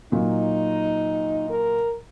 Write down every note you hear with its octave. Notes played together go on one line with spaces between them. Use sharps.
A#2 F#3 D#4
A#4